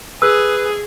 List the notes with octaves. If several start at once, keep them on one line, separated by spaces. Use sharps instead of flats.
G#4 B4 E6